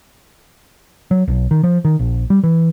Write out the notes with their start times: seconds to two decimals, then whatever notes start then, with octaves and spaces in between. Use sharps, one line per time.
1.11 F#3
1.28 B1
1.51 D#3
1.63 F3
1.85 D#3
1.99 A#1
2.30 G3
2.44 E3